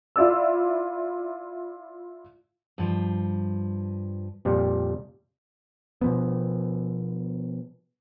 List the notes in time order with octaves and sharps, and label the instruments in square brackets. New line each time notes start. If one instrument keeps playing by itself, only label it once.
[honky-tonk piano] E4 F4 D5 E6
[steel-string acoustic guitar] G2 F3
[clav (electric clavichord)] F2 A#2 G3
[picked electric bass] B2 F3 B3